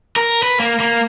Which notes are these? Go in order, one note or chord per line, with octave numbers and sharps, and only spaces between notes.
A#4
B4
A#3
A#3